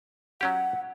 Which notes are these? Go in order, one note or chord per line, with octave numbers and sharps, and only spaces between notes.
F#3 C#4 G4 F#5